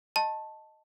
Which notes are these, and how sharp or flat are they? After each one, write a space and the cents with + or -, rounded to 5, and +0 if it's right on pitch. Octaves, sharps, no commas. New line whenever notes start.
D#5 +0 A5 +0 C6 +45